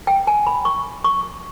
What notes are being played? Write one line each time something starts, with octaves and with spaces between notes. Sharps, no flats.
G5
G#5
B5
C#6
C#6